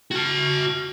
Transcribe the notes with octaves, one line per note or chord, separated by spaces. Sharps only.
F#4 A5